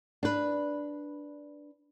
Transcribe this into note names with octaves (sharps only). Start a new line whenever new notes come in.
D4 B4